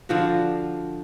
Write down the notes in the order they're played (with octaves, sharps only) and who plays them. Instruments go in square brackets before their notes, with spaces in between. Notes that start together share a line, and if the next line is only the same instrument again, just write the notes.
[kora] D3 F3 F#4